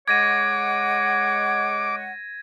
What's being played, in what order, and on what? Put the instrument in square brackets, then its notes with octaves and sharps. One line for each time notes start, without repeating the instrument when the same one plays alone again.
[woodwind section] G#3 C#5 F#5 [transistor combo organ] D6 [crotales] G#6 A#6 D#7